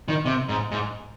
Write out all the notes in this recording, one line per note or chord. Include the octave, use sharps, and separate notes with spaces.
D#3
C3
G#2
G#2